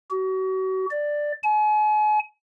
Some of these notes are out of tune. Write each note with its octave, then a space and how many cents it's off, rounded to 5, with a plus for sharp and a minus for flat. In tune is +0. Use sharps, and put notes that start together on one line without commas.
F#4 +35
D5 +10
G#5 +40